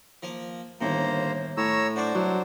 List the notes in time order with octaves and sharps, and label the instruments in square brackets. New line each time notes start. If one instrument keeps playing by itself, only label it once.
[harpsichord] F3 A#3
[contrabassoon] G1 [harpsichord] D#2 A2 [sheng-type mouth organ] A#3 C5 A#5
[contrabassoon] A2 [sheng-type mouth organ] C#5 A#5 E6
[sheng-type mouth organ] D4 C5 [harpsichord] F#4 D5 C#6
[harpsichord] C2 [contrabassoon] F#3